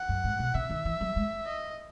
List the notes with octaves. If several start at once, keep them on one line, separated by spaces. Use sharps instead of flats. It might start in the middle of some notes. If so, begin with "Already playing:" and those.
Already playing: F#5
F#2
G#2
B2
C#3 E5
D#3
E3
F#3
G#3
D#5